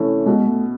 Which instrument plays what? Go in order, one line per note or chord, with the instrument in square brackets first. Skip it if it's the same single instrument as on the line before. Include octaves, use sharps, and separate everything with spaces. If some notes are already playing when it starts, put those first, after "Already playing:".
Already playing: [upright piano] C3 E3 A3 C#4
[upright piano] B2 [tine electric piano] G#3
[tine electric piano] A3